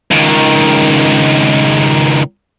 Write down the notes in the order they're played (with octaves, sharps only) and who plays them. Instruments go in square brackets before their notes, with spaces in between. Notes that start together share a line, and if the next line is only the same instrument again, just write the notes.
[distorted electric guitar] C#2 D#3